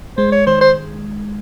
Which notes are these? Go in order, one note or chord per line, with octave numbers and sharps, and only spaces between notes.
G#3 C5
C#5
D#3 C5
C5